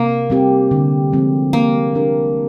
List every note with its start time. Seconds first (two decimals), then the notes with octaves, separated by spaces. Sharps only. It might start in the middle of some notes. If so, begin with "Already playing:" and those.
Already playing: C3 A#3
0.30 G3 C4 G4
0.71 D3
1.13 F3 G#3 C4
1.53 G3 A#3
1.95 D4 G4 A#4